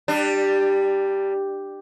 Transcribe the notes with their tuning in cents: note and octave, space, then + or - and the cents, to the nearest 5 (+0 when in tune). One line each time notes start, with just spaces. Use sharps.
G3 +0 D4 +25